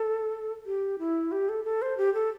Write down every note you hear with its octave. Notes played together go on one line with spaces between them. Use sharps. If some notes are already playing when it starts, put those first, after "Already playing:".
Already playing: A4
G4
E4
G4
A4
A4
C5
G4
A4